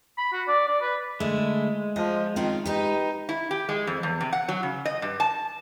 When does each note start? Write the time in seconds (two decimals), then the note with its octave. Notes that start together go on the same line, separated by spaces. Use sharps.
0.17 B5
0.33 F#4
0.47 D5
0.68 D5
0.81 B4
1.20 D3 G#3 A3 E4
1.96 F3 D#5
2.36 D#3 C4 C#4 F4
2.66 D#4 G4 B4
3.29 E4
3.51 G4
3.69 G#3
3.87 F2
4.03 E2
4.21 C3
4.33 F#5
4.49 F#3
4.63 C#3
4.85 D#5
5.02 G2
5.20 A5